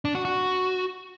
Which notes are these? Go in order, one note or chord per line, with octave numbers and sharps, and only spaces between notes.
D4
F#4
F#4